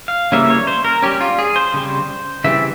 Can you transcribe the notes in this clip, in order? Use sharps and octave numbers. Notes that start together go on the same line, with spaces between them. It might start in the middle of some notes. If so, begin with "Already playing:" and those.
F5
C#3 E3 G3 A#3 C#4 E5
C#5
C5
A#4
G3 C#4 G4
F4
G#4
C5
C#3 G3 C4
C#3 E3 G3 C4 E5